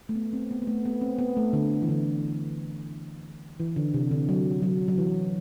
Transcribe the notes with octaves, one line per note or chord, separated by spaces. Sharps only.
A3
B3
C4
B3
B3
A3
B3
C4
B3
A3
D3
E3
D3
E3
D3
C3
D3
F#3
F#3
F#3
E3